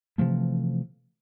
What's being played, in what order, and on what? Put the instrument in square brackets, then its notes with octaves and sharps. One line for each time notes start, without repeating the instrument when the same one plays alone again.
[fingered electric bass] C3 E3 F3 A3